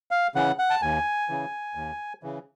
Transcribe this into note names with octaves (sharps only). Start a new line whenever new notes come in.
F5
C#3 E3 F#5
F#5
A5
D#2 G#5
C#3 E3
D#2
C#3 E3